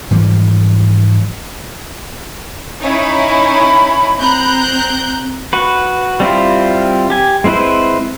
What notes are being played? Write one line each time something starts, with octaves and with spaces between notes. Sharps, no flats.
G#2 E3 F3 G3
C#4 D#4 E4
B5
C4 A#5 F#6 G6
F#4 B4
G3 C4 E4 F4
G4 G#5
G#3 C4 E4 B4 C5